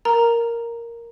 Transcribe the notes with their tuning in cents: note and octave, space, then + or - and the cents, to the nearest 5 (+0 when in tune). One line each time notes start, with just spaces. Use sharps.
A#4 +0 A#5 +0